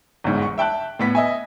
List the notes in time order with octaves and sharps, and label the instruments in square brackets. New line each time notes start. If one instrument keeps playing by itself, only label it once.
[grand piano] G1 E2 G#2
C#6
E5 G5 A5 F#6
A2 B3 B6
D#5 E5 G#5